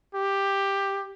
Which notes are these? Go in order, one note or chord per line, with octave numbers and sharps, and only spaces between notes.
G4